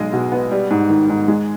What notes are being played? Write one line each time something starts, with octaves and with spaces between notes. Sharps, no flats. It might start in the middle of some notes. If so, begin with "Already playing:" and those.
Already playing: B1 G#3 D#5
B2
B3
G3
G#2
D#3
G#2
G#3